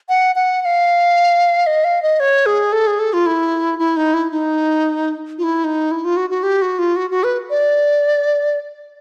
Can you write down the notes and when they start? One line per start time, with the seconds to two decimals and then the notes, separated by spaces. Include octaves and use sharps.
0.09 F#5
0.35 F#5
0.62 F#5
0.65 F5
1.66 D#5
1.84 F5
2.02 D#5
2.20 C#5
2.46 G#4
2.72 A4
2.87 G#4
2.99 A4
3.13 F4
3.26 E4
3.79 E4
3.96 D#4
4.14 E4
4.31 D#4
5.38 F4
5.43 E4
5.64 D#4
5.91 E4
6.04 F4
6.16 F#4
6.30 F#4
6.43 G4
6.62 F#4
6.79 F4
6.96 F#4
7.10 F#4
7.24 B4
7.50 D5